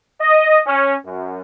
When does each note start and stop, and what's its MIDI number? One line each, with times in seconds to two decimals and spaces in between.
0.21 0.59 75
0.66 0.94 61
1.05 1.41 42